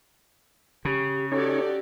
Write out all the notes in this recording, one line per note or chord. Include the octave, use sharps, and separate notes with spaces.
C#3 G4
C#4 D#4 F#4 G4 A4 C#5 D5